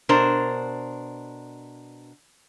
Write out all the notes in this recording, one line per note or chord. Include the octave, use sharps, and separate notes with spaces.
B2 D4 A#4 C5